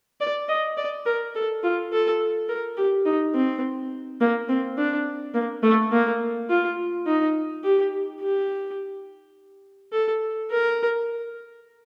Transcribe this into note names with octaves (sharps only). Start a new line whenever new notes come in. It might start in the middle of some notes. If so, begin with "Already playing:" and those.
D5
D#5
D5
A#4
A4
F4
A4
A#4
G4
D#4
C4
A#3
C4
D4
A#3
A3
A#3
F4
D#4
G4
G4
A4
A#4